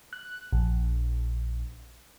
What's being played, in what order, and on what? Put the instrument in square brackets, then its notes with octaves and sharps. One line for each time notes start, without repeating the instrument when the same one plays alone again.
[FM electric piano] F#6
A#1